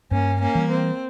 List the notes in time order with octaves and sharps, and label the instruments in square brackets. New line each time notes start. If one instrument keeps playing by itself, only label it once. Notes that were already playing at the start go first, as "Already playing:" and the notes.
[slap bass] G2 [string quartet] A#3 C#4
[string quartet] A#3 C#4
[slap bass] E3 G3
[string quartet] C4